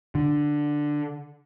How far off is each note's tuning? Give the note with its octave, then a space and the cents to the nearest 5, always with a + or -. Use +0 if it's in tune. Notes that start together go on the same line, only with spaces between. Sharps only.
D3 +5